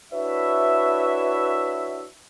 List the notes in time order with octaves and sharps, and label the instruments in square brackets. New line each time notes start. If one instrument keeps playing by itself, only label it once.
[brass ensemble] D4 E4 F#4 B4 C#5 E5